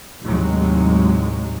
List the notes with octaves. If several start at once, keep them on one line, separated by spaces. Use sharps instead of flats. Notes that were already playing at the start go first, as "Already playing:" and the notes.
D#2 A2 C3 F#3 G#3